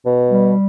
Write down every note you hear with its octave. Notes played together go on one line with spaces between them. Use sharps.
B2
G3